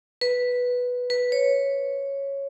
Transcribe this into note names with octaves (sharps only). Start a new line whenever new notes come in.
B4
B4
C#5